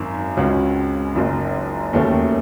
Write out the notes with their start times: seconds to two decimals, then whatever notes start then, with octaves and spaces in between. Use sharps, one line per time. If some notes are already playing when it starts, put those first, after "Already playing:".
Already playing: G#1 F#2 D#3
0.37 C#2 C#3 G#3 C#4 F#4
1.15 F#1 F#2 D#3
1.93 E1 D#2 D#3 A3 C#4